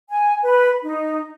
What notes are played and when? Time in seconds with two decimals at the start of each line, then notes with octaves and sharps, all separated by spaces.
0.09 G#5
0.43 B4
0.84 D#4